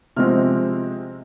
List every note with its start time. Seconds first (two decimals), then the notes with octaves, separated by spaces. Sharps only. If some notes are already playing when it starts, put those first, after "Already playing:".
0.16 C3 F3 G#3 C4 F6